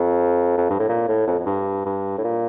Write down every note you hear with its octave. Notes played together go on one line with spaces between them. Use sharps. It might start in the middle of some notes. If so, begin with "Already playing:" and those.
Already playing: F2
F2
G2
A2
A#2
A2
F2
F2
G2
G2
A2
A#2